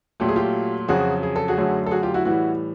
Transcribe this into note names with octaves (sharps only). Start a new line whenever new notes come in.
A#2 F#3 A3 G4
G#4
F4 G4
F2 C#3 F#3 F#4 G#4
G#4
A4
F#4 G#4
F#2 D3 F#3 A3
A4
F#4 G#4
F4 G4
E4 F#4
A2 E3 G3 E4 F#4